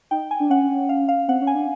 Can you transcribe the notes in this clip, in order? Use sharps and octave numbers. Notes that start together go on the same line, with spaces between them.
D#4 G5
G#5
D4
C#4 F#5
F5
F5
C4 F#5
C#4
G#5
D4